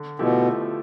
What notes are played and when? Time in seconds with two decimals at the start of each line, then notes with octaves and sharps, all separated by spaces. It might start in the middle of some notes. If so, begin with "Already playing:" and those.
Already playing: D3
0.19 B2 F3 A3 E4 G4